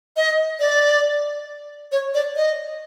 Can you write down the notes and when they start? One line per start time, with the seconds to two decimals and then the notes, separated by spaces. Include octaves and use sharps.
0.17 D#5
0.60 D5
1.92 C#5
2.14 D5
2.36 D#5